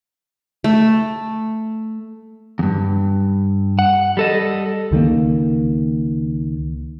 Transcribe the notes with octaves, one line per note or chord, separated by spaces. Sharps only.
A3
E2 G2
F#5
G3 A4 D#5
C#2 D#3 G3 A#3